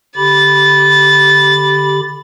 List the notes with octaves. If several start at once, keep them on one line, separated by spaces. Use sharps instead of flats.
D3 G4 B5 A6